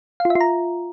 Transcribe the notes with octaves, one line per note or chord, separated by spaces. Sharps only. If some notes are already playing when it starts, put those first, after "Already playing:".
F5
F4
E5
F4
A#5